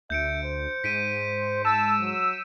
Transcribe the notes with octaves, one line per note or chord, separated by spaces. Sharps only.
D2 E5 G6 C#7 D7
C5
G#2 B6 D7 D#7
A5 E6 E7
F#3